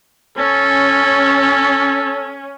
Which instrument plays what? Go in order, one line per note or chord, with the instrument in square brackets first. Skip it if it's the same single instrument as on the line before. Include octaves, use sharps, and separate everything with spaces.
[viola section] C#4 [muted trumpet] A4